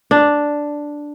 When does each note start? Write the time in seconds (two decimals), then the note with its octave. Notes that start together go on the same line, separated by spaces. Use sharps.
0.11 D4